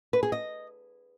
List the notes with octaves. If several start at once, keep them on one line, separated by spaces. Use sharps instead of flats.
B4
G#4
D#5